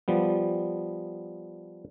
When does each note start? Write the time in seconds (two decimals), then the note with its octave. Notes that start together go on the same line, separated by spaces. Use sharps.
0.08 F3 G3 B3